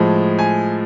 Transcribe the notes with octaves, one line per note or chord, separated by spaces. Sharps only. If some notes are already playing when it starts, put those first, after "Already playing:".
Already playing: A2 F3 G#3
G#5